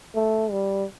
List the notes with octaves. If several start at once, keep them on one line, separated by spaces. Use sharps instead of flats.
A3
G3